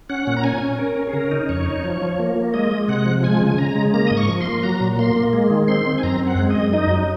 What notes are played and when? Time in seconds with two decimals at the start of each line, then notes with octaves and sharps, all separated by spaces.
0.09 C#4 F#5
0.27 A#2
0.37 A#5
0.44 C#4 G#5
0.62 C#4
0.79 C#4 A#4
0.96 C#4
1.07 G#4
1.13 C#3 A#4
1.31 D#4
1.49 F2 C#5
1.66 D#4
1.83 F3
2.02 F3
2.19 A#3
2.36 A#3
2.54 G#3 D#5
2.71 G#3
2.88 C3 F#5
3.06 F3
3.23 G#3 G#5
3.41 C#3
3.47 G#5
3.58 C#3 A#5
3.75 G#3
3.94 A#3 A#5
4.07 G#2 D#6
4.17 C#6
4.28 F3
4.41 C6
4.46 A#3
4.63 F#3 A#5
4.80 A#2
4.99 A#3 C6
5.16 A#3
5.33 G#3
5.50 D#3
5.68 C4 C6
5.86 C4
5.98 G#5
6.03 F#2 A#5
6.21 C4
6.27 F#5
6.38 G#3
6.50 D#5
6.55 F#2
6.73 D#4 D#5
6.91 F#3